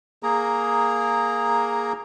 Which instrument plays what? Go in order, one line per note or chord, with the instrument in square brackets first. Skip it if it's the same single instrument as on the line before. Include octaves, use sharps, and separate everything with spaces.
[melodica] A#3 G#4 A#5